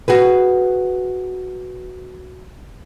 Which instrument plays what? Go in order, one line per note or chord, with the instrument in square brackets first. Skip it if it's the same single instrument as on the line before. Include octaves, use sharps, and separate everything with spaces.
[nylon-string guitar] F#4 G#4 B4